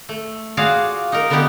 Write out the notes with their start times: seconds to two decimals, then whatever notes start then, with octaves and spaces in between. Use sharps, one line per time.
0.09 A3
0.57 F4 F#4 G#4 D5 F5
1.12 D#4 A#4
1.30 D3 B3 D4 D#4 G4